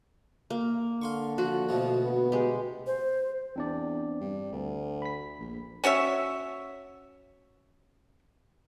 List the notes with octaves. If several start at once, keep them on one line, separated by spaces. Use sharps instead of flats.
A#3
D3 F5 C6 C#6
F3 F#4
D2 B2 F3 A3
B3
G#3 G4
C5
E2 C4 D4 D5
G2
D2
B5 B6
A#1
C#4 F#4 C#5 E5